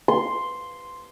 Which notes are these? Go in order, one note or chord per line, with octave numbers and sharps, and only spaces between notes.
C6